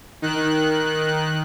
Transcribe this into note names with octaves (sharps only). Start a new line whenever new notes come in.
D#3 F#6